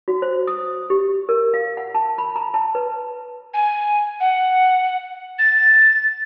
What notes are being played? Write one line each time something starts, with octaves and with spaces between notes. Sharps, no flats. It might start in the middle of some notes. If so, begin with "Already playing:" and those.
F#4
C5
D#6
G4
A#4
F5
F#5
A5
B5
A#5
A5
B4
G#5
F#5
A6